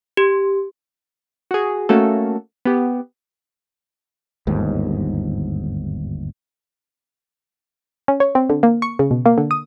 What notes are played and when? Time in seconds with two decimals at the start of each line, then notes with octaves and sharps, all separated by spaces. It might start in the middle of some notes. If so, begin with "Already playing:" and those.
0.17 G4
1.51 F#4 G#4
1.89 A3 A#3 C#4 F#4 A4
2.65 B3 G4
4.47 G1 D#2 G#2
8.08 C#4
8.20 C#5
8.35 C4
8.50 D3
8.63 A#3
8.82 C#6
8.99 C#3
9.11 B2
9.26 A#3
9.38 D3
9.51 D#6